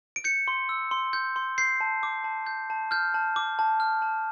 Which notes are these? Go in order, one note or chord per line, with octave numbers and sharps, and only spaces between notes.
D7
G6 C#7
C6
E6
C6
G6
C6
G6 C7
A5
D6
A5
G6
A5
F6 G6
A5
D6
A5
F6
A5